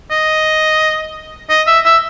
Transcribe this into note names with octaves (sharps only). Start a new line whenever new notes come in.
D#5
D#5
E5
E5